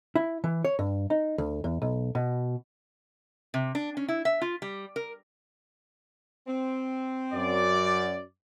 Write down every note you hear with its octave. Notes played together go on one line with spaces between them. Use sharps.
E4
E3
C#5
G2
D#4
D2
E2
B1
B2
C3
D4
C#4
E4
E5
F4
G3
A#4
C4
F#2 D5